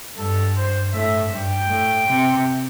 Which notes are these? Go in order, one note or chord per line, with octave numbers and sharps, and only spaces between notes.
G2 A4
C5
A2 E5
G2 G5
A2
C3